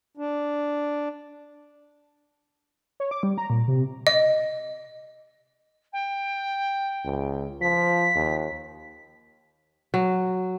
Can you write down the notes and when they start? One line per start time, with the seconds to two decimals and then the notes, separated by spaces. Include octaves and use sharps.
0.17 D4
3.00 C#5
3.11 D6
3.23 G3
3.38 A#5
3.50 A#2
3.68 C3
4.07 D#5
5.92 G5
7.04 C#2
7.61 F3 B6
8.15 D#2
9.94 F#3